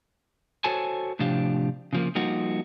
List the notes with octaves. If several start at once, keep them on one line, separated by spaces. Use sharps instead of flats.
F#4 A4 C5 C#5 G#5 A5
A2 C3 F3 D4 G4 F5
C#3 F3 A#3
F3 G3 A#3 D#4 F#4